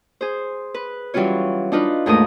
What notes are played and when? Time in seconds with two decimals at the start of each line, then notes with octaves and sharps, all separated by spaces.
0.21 G#4 C5
0.74 B4
1.14 E3 F#3 G3 C#4 F4 C#5
1.72 D4 D#4 F4 B4
2.06 D#2 G#2 A3 A#4 D#6